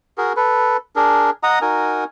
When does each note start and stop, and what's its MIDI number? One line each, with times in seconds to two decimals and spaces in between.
0.18 0.33 66
0.18 0.33 68
0.18 0.33 70
0.37 0.77 69
0.37 0.77 71
0.96 1.30 62
0.96 1.30 68
0.96 1.30 70
1.43 1.59 75
1.43 1.59 78
1.43 1.59 82
1.43 1.59 87
1.62 2.04 63
1.62 2.04 66
1.62 2.04 70
1.62 2.04 80